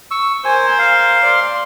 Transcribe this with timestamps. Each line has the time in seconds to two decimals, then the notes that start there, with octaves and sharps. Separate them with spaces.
0.11 C#6 E6
0.45 A#4 C5 G#5
0.79 F5
1.24 D5 C6